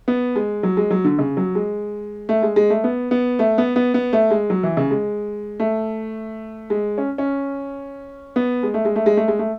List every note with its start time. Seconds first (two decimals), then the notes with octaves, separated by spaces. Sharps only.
0.08 B3
0.36 G#3
0.63 F#3
0.77 G#3
0.91 F#3
1.04 D3
1.19 C#3
1.37 F#3
1.55 G#3
2.29 A3
2.43 G#3
2.56 G#3
2.70 A3
2.84 B3
3.11 B3
3.39 A3
3.58 B3
3.76 B3
3.94 B3
4.13 A3
4.31 G#3
4.50 F#3
4.63 E3
4.77 C#3
4.91 G#3
5.60 A3
6.70 G#3
6.98 C#4
7.18 C#4
8.36 B3
8.63 G#3
8.74 A3
8.85 G#3
8.96 A3
9.06 G#3
9.17 A3
9.28 G#3
9.39 A3